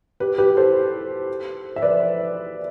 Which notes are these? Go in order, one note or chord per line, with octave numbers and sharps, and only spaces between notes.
G4 B4
G4 B4
A4 C5
E5
B4 D5